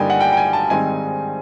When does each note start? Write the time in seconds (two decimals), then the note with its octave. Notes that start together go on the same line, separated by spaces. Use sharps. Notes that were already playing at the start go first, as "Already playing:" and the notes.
Already playing: G2 D3 G3 A#3 D#4 G5 G#5
0.10 F#5
0.20 G5
0.32 G5
0.37 G#5
0.53 A5
0.70 G#2 D#3 G3 C4 D#4 G#5